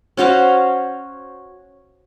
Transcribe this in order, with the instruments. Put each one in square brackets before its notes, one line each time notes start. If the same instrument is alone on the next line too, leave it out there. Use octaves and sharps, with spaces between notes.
[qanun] C#4 F#4 C5 F5